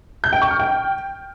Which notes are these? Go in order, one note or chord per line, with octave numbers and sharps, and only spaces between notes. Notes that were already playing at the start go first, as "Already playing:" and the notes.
G6
G5
C#6
F6
G5